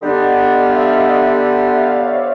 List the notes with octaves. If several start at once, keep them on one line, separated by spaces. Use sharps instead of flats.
D3 G3 B3 D4 D#5
F5
E5
F5
D#5
E5
F5
D5
C#5
C5